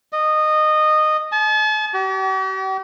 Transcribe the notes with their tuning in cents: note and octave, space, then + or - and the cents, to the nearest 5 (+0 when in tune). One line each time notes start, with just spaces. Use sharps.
D#5 -15
A5 -40
G4 -45